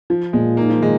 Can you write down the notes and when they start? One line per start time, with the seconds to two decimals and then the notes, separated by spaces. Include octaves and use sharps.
0.10 F3 F4
0.33 A#2 G#3
0.57 A#3 D#4
0.70 F3
0.82 D#3 G#3